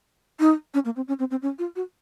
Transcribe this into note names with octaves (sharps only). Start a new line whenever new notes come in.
D#4
C#4
A#3
C4
C#4
C4
C4
C#4
F4
F#4